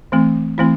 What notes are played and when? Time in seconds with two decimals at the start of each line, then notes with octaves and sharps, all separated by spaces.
0.12 E3 A3 C4
0.58 E3 A3 C4 E4